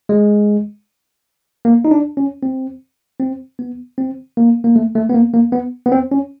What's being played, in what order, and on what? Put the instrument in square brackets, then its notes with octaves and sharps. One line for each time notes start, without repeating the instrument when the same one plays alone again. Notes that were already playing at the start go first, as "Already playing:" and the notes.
[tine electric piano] G#3
A#3
D#4
D4
C#4
C4
C4
B3
C4
A#3
A#3
A3
A3
B3
A#3
A#3
B3
B3
C4
C#4